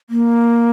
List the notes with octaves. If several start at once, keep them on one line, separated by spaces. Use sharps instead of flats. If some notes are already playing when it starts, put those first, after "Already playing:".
A#3